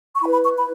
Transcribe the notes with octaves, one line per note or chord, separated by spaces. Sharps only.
C#6
E4 B4 B5
B5
C#6
B5